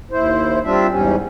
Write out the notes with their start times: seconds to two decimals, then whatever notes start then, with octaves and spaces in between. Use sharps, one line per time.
0.11 D#2 E4 C5
0.64 G3 C4 D4 F4 E5
0.91 E2 G#2 G3 C#4